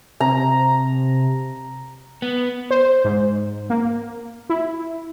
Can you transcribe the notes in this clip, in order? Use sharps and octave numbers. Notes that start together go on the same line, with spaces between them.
C3 A#5
B3
C5
G#2
A#3
E4